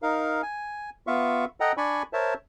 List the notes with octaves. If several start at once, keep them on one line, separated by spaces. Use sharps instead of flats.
D#4 A#4 F5
G#5
B3 F4 E5 F5 C#6
A4 D#5 F#5 G5 A#5
D4 D5 G#5 B5 C#6
A#4 C5 C#5 E5 A5